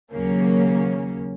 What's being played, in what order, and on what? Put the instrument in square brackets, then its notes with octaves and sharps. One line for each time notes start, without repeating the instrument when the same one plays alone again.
[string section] D#2 C#3 F#3 A#3 C#4